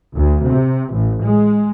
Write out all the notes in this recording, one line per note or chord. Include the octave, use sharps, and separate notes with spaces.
D2
C3
A1
G#3